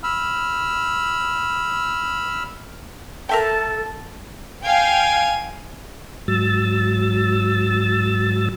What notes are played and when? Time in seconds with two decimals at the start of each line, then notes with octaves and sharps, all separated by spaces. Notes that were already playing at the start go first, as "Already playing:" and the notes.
0.04 B5 E6 F6
3.29 A4 A#4 E5 G5 A5
4.64 F5 G5 G#5
6.28 G#2 F#3 E6 A6